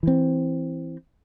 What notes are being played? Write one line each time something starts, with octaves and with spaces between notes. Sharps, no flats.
E3 C4